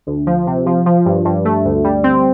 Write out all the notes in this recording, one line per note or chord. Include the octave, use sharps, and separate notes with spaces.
D2
F3
C3
F3
F3
G2
G2
A3
D2
G3
C4